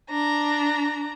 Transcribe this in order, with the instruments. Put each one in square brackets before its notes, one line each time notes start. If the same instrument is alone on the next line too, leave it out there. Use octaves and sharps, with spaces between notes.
[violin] D4 A#5